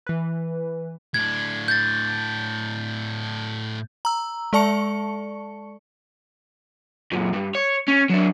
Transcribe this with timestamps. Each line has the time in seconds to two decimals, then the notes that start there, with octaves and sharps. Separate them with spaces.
0.07 E3 B4
1.14 A2 D4 G#6
1.68 G6 A6
4.05 A#5 E6
4.53 G#3 A4 D5 A5 C#6 C#7
7.12 F#2 A#2
7.33 G2
7.55 C#5
7.88 C#4
8.10 F#3 D4